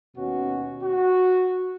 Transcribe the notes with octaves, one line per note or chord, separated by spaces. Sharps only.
D#2 B2 C#4 F#4
F#4